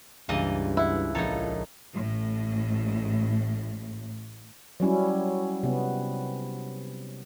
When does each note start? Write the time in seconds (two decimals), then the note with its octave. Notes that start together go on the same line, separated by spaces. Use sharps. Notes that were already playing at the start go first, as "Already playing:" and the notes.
0.29 C#2 G2 E3 A#3 D#5 D#7
0.77 E4 F#5 F#6
1.15 A#1 D#4 A4 C#5 A#5
1.96 A1 A2
4.80 F#3 G3 C#4 E4
5.63 C3 B3